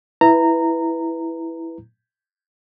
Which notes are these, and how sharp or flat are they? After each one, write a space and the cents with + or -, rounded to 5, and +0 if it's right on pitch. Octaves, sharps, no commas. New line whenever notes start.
E4 +0 B4 +0 A#5 -15